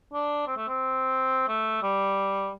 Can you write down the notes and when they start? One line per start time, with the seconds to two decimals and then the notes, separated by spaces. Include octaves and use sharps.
0.13 D4
0.47 C4
0.57 A3
0.68 C4
1.48 A3
1.82 G3